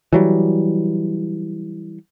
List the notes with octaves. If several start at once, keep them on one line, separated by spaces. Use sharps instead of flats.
E3 F#3 G3